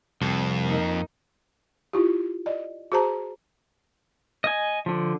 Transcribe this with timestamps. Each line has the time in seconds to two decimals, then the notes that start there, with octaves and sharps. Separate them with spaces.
0.21 C2 F2
0.65 A#3 D#4
1.93 E4 F4 G4
2.46 D5 D#5
2.92 F#4 G#4 C5 A5 A#5
4.44 D#5 G#5
4.86 D3 F3